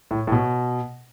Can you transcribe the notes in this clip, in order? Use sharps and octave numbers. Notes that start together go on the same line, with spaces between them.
A2
A2
B2